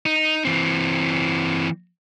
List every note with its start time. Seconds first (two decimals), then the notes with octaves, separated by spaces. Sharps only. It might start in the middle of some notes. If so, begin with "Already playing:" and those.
0.06 D#4
0.45 E3 C4